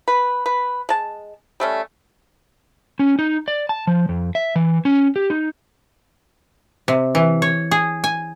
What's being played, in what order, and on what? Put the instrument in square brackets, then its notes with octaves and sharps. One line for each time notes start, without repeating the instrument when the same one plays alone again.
[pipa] B4
B4
G#3 A5
G3 A3 C#4
[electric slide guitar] C#4
D#4
D5
A5
F3
F2
E5
E3
C#4
G4
D#4
[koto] C3
E3
C#5
G#4
G#5